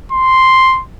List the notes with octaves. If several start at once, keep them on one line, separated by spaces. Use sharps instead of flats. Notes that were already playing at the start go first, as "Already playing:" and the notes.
C6